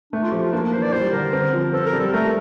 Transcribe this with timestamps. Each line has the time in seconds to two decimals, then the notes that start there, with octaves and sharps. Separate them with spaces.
0.12 A3 D4
0.23 F4
0.32 F3 G4
0.43 F4
0.52 A#3 D4
0.63 D4
0.73 E3 C5
0.83 D5
0.93 G3 C5
1.13 D3 A#4
1.33 C4
1.53 F3
1.73 C4 A4
1.86 A#4
1.93 G3
2.00 A4
2.13 A3 A#4